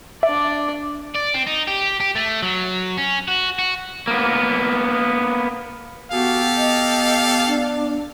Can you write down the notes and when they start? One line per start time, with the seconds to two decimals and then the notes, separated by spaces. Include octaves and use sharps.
0.23 D4 D5 E5
1.15 D5
1.34 C4
1.47 D#4
1.67 G4
2.00 G4
2.16 A3
2.43 F#3
2.98 C#4
3.28 F#4
3.59 F#4
4.08 A#3 B3
6.12 B3 F#4 G4 A4 F5
6.56 D#5
7.47 D4